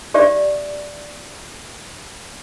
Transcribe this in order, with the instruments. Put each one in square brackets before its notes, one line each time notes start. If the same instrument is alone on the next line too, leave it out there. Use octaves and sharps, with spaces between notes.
[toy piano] G4 D5 E5